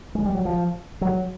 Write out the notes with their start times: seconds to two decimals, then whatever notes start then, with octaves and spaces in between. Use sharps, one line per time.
0.15 G#3
0.25 G3
0.35 F#3
0.45 F3
1.01 F#3